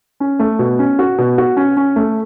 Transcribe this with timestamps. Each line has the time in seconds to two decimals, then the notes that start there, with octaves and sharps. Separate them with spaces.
0.20 C#4
0.39 A3
0.59 B2
0.79 C#4
0.99 F#4
1.18 B2
1.38 F#4
1.57 C#4
1.77 C#4
1.96 A3